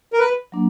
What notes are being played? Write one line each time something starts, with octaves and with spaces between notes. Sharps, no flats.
A#4
B4
F#3 A#3 D4